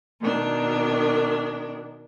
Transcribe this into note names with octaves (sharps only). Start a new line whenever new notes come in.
B2 D#3 D4